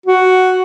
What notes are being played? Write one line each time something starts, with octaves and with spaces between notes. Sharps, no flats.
F#4